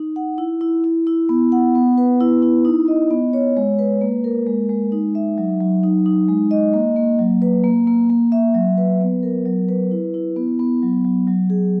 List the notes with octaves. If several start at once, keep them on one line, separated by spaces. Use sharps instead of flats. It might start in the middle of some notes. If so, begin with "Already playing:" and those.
Already playing: D#4
F#5
E4
E4
E4
E4
B3
F#5
B3
B4
E4
E4
D#4
D#5
B3
C#5
G#3
B4
A#3
A#4
G#3
G#3
D#4
E5
F#3
F#3
D#4
D#4
G#3
D#5
A#3
A#3
F#3
B4
A#3
A#3
A#3
E5
F#3
B4
B3
A#4
F#3
B4
E4
E4
B3
B3
F#3
F#3
F#3
G#4